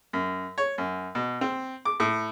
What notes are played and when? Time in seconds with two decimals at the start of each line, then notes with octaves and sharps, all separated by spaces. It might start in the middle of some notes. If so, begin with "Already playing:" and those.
0.13 F#2
0.58 C#5
0.78 F#2
1.15 B2
1.41 C4
1.85 D6
2.00 A2